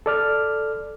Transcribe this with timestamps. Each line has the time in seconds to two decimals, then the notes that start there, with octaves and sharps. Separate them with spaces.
0.06 A4 D5 F6